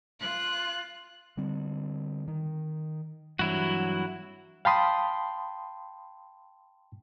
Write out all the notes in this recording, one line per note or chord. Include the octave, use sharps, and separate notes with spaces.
F4 F#6
D3 G3 C4
D#3
G2 E3 F#3 E4 F#4
F5 G5 A5 B5 C6 D#6